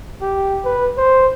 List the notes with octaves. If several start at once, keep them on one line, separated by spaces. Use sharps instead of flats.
G4
B4
C5